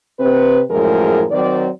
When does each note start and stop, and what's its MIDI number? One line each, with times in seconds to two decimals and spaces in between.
0.20 0.61 48
0.20 0.61 60
0.20 0.61 71
0.70 1.25 42
0.70 1.25 45
0.70 1.25 53
0.70 1.25 56
0.70 1.25 68
0.70 1.25 70
1.30 1.67 51
1.30 1.67 54
1.30 1.67 60
1.30 1.67 74